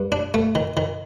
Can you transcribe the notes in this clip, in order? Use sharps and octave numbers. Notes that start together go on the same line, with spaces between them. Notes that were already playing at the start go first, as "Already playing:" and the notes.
Already playing: G2
D4
A3
D#3
D#3